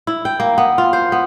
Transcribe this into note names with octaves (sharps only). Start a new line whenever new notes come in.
E4
G5
A#3
B3
F4
C5
B3